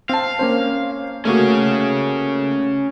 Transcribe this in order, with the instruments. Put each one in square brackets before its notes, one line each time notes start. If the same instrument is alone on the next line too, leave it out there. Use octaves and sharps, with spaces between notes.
[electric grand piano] C4 A5 [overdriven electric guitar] F5
[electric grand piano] A#3 C#4 C5
[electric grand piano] A3 A#3 F#4 [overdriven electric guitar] C#4 G#4